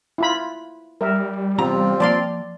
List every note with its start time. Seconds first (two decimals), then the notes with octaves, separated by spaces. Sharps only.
0.18 E4 F4 B5
1.01 G3 A#4 E5
1.58 E2 C3 C4 F4 A#5
2.00 F3 A#3 D5 F5 C6